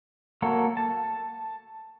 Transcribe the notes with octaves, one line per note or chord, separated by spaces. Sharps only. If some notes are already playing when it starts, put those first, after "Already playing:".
F#3 A#3 A4 C#5
A5